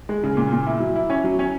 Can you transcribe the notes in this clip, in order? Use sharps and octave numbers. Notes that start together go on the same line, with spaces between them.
G#3
C#3
A#2
A#2
E4
F#3
E4
C#4
F#3
C#4